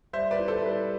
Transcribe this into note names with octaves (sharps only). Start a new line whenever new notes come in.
G3 C5 E5
B4 D5
E4
A4 C5
G3 B4